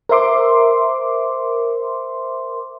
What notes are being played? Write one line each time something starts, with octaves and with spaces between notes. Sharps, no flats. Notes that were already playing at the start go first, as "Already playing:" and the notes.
A#4 C5 E5 C6 D6